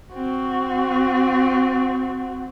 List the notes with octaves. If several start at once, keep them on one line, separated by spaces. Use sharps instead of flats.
C4 F#4